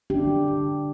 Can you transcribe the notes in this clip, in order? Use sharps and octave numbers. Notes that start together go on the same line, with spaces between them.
D3 D4 G4
D3